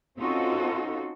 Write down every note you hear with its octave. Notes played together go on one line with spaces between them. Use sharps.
C4 C#4 D#4 F4 F#4 A4